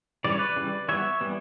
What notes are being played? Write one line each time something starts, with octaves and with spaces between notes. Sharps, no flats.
C#3 E3 G3 D5
C#5
B4 D5
C#3 E3 G3
E3 G3 B3 C#5 E5
E3 G3 B3